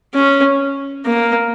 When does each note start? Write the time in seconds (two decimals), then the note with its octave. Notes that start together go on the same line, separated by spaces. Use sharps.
0.15 C#4
1.06 A#3